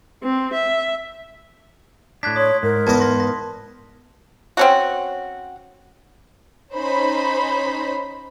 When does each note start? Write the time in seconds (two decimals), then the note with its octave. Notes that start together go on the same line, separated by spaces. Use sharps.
0.23 C4
0.54 E5
2.23 A2 D4 F#6 G#6 B6
2.36 C#5 C6 D#6
2.63 G#2 A#4
2.87 E2 D#5 A5
3.00 C6 A#6
3.20 A#6
4.57 C4 C#4 F#4
6.74 C#4 D#4 C5 B5